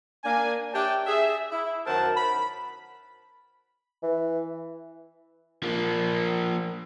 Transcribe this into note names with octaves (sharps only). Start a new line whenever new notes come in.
A#3 D4 G#5
D4 G4 C#5 E5 G5 A5
G#4 E5
E4
F#2 D#3 A#4 C5 F#5 A5
B5
E3
F3 A#3